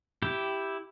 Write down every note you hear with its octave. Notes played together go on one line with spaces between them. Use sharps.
E4 G4 G5